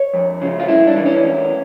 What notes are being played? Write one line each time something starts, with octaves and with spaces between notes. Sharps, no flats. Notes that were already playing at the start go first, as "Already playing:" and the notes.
Already playing: C#5
F2
C#3 F3
F4
G2 E4
D4
E3
C#4
E2